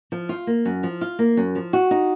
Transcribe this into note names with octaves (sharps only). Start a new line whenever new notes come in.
F3
F4
A#3
F#2
F3
F4
A#3
F#2
F3
F#4
D#4